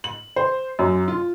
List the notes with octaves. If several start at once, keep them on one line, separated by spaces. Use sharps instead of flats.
F#7
C5
F#2
F4